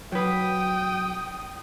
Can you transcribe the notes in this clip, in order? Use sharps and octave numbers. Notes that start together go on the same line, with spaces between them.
F#3 B4 G5 D#6